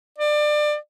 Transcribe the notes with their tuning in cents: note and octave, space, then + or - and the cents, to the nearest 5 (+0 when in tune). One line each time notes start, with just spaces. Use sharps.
D5 +25